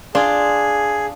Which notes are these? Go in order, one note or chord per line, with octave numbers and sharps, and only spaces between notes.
D4 F4 G#4 C6